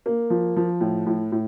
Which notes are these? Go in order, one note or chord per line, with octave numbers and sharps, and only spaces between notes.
A#3
F3
F3
A2
A2
A2